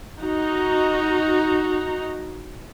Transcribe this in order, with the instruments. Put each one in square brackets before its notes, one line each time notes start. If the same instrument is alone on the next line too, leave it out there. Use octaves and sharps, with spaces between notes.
[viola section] D#4 F#4 A#5